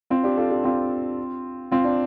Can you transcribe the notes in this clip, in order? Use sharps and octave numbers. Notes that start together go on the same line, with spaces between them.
C4 F4
D4 G4
F4 A4
D4 G4
C4 F4
C4 F4
D4